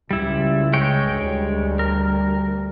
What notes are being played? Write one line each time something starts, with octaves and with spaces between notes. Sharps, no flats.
C#2 G3 E4
G#3 C#5 G5
D2 G3
A#4